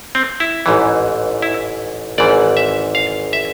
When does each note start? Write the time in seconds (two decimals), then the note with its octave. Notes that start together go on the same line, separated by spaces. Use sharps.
0.15 C4
0.40 E4
0.66 A1 G#2 E3
1.42 E4
2.18 G#1 G#2 E3 D5
2.57 E5
2.95 F5
3.33 E5